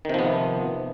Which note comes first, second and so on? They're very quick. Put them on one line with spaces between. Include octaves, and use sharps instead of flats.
D#3 C3 F3 B3